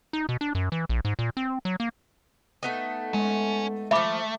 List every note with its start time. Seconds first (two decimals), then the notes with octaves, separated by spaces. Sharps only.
0.13 D#4
0.29 B2
0.41 D4
0.55 F#2
0.72 E3
0.89 A#1
1.05 G#2
1.19 A#2
1.37 C4
1.65 F#3
1.80 A#3
2.63 A3 B3 D#4
3.14 G#3 C#4
3.91 E3 F3 A3 E5 B5 D6